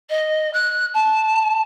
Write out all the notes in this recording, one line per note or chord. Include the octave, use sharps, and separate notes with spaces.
D#5
F#6
A5